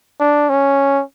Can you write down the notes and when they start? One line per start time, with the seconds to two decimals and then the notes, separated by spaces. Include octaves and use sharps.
0.20 D4
0.49 C#4